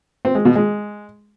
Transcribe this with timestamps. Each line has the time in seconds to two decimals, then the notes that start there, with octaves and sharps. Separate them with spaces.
0.25 C4
0.35 G#3
0.45 B2
0.55 G#3